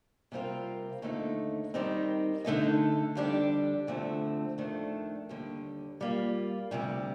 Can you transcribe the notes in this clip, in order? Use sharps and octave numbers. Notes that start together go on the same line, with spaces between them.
C3 G3 C4 F4 A#4
D#2 D3 A3 D#4
D#3 G3 C4 D#4 A#4
D3 A3 D#4 A4 D#5
F2 D3 G3 D4 G4
D2 D3 F3 A3 C4
F2 D#3 A3 D4
D#2 D3 G3
G3 A#3 F4
D2 C3 G3